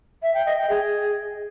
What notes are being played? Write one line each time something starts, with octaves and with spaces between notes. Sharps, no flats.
E5
G5
D#5
G5
G#4